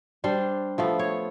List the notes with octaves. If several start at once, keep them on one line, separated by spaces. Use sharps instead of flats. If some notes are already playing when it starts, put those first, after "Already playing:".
G3 D4 C5
F3 A3 B3
C#5